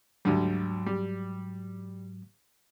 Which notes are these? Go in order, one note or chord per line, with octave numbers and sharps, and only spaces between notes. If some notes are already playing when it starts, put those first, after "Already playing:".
D2 G#2 D3 F#3 G3
G3